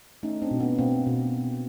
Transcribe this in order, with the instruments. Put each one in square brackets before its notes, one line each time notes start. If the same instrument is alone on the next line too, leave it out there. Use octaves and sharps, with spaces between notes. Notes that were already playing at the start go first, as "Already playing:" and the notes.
[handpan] A3 C#4 D#4
C4 D4
B2
B3 C#4
B2 A#3 C4
B2